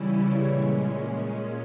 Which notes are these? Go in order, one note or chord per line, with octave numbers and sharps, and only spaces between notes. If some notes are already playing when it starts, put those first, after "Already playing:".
Already playing: C#3 E3 G3 C#4 E4
A#2 G#3 C#4